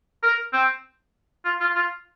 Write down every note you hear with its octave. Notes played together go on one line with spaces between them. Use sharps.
A#4
C4
F4
F4
F4